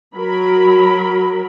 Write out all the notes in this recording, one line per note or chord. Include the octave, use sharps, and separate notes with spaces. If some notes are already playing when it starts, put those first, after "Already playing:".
F#3 A#4 B5